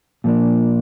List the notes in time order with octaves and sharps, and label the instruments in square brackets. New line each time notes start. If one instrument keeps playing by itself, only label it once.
[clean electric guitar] A#2 F3 A#3 D4